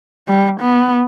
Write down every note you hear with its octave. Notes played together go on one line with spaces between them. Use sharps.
G3
B3